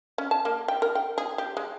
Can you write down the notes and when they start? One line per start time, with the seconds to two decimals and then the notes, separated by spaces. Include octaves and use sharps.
0.18 C#4
0.31 A5
0.45 A#3
0.68 G5
0.82 A#4
0.95 G5
1.18 G#4
1.38 G4
1.57 G#3